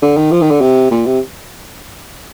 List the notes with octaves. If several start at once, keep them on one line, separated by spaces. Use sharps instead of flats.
D3
D#3
F3
D#3
D3
C3
A#2
C3